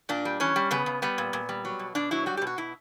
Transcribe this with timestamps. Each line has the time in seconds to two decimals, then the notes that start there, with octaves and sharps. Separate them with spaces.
0.09 A#2 D4
0.25 G3
0.40 E3 C#4
0.56 G3
0.71 C#3 B3
0.86 C#3
1.02 G3 B3
1.18 A#2
1.33 A#2
1.49 G3
1.65 F#3
1.79 B2
1.95 B2 D4
2.11 F#3 E4
2.26 G3 F#4
2.37 G4
2.42 B2
2.47 F#4
2.58 B2 E4